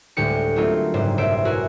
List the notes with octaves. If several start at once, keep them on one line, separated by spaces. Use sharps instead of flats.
D2 A2 G3 G#3 G4 C#7
F#3 A3 A#3 C4 D#4 F4
F#1 G#2 G3 C5
B1 C5 E5 D7
E4 F#4 G#4 A#4